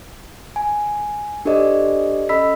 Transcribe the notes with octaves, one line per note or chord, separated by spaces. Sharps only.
G#5
D4 G4 A4 C5 D5 D#5
C#4 A4 D#5 B5 E6 B6